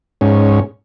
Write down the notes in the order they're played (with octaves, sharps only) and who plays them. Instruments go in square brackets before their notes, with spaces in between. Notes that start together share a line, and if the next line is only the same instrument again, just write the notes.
[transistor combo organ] G#2 C#4